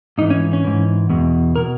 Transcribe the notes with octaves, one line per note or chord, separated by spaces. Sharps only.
G#2 E3 D#4
C#4
C#4
G#2 E3
E2 B2
B2 A#4